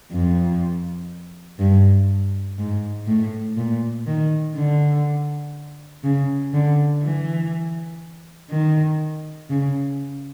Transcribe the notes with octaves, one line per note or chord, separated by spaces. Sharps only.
F2
G2
G#2
A2
A#2
D#3
D3
C#3
D3
E3
D#3
C#3